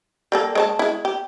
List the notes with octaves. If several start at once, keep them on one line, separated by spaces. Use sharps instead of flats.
G3 A#3 A4
G#3 C#5 A5
G#3 E4
G4